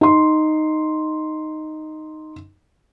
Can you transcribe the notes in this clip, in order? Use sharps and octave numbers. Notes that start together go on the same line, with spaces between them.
D#4 C6